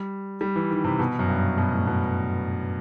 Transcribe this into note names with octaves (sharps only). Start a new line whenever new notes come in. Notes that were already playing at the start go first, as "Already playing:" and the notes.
Already playing: G3
G3
E3
D#3
C3
B2
F#2
G2
B2
A2
B2